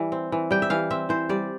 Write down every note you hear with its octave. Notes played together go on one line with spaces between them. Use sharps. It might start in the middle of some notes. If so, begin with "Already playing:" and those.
Already playing: E3 G3
C4
E3
G3 G5
E5
E3 F5
C4 E5
E3 C5
G3 D5